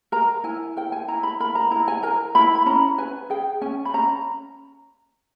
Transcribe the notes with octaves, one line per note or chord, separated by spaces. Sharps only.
A#4 A#5
E4 G#5
A#4 G5
G#5
E4 A#5
B5
A#4 B5
A#5
E4 A#5
G#5
A#4 A#5
E4 B5
B5
C#4 A#5
B4 G#5
G#4 G5
C#4 G#5
B5
C#4 A#5